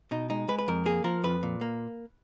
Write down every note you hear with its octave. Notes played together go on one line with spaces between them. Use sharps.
B2 D#4
G#3 D#4
G#3 B4
B4
F2 A#4
A#3 G#4
F3 A#4
F2 B4
A#2
A#3